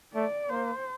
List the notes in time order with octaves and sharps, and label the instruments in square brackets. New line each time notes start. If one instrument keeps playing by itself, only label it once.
[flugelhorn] A3 [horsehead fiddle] D5
[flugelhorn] A#3 [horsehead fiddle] C5